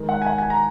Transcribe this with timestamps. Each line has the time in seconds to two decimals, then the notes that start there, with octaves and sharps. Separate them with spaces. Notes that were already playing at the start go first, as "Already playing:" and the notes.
Already playing: D#3 G#3
0.09 F#5
0.22 G#5
0.26 F#5
0.38 G#5
0.50 A#5